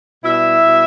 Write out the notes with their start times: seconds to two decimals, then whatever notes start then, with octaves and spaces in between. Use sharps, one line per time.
0.24 B2 G3 E4 E5
0.60 B2 G3